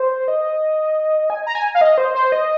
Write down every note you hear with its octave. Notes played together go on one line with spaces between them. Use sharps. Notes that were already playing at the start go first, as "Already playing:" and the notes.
Already playing: C5
D#5
G#5
A#5
G#5
F5
D#5
C5
C5
D#5